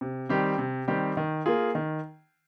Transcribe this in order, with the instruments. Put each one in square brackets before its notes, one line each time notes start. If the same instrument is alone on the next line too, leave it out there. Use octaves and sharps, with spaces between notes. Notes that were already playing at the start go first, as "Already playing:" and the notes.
[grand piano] C3
D#3 G3 C4 G4
C3
D#3 G3 C4 G4
D#3
A#3 F4 G#4
D#3